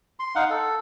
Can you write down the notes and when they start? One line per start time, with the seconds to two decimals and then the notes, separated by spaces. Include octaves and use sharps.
0.19 C6
0.35 D#4 F5 F#5
0.50 A4